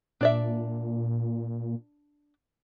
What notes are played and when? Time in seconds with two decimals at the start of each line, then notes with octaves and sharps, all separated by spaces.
0.21 A#2 D4 D5 E5